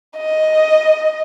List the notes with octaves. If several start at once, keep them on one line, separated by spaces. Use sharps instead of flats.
D#5